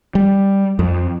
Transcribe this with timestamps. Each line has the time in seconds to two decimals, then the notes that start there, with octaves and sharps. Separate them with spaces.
0.15 G3
0.79 F2